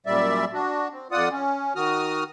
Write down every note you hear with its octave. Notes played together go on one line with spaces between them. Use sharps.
F#2 A#2 G3 D5 E5
D4 F#4
C4
F2 F4 D5 F#5 D#6
C#4
D#3 F#4 D#6 F6